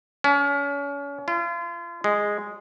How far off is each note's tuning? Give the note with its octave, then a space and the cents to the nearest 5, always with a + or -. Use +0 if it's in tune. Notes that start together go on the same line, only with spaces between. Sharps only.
C#4 +35
F4 -35
G#3 -10